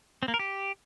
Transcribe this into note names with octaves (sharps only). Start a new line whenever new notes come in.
C4
A#3
A#4
G4